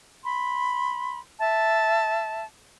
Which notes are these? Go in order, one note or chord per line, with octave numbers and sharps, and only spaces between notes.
B5 C6
E5 A5